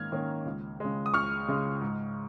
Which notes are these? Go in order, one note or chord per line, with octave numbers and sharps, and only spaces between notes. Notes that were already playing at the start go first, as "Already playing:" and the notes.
Already playing: G#2 D#3 A#3 C#4 F6 G#6
D#3 A#3 C#4
C#2
C#3 G#3
D#6
C#2 C#6 F6
C#3 G#3
G#2